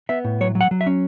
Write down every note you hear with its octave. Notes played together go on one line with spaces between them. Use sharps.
B3 E5
A2
F#3 C#5
F#3
F#5
F#3
E5
C#4